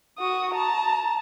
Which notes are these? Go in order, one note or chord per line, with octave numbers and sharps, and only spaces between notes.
F#4 D#6
A5 A#5